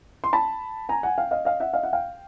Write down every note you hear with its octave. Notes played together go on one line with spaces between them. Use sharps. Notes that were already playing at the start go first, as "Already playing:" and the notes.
C6
A5 B5
G#5 A#5
F#5 G#5
F5 G5
D#5 F5
D#5 F5
E5 F#5
D#5 F5
E5 F#5
F5 G5